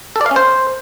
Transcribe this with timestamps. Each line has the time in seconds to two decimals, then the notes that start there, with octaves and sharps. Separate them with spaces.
0.16 A4
0.21 D5
0.26 F5
0.31 C#4
0.36 C5